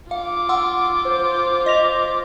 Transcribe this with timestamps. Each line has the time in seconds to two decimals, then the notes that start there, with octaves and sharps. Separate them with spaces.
0.11 F4 F5 D6
0.49 F#5 C6 E6
1.05 C5
1.66 D#5 A#6 F7